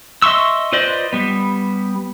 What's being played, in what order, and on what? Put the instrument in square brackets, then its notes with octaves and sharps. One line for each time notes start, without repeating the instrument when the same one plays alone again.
[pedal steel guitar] D#5 E5 C6 C#6 E6
F4 B4 C5 D5 D#5
G3 B3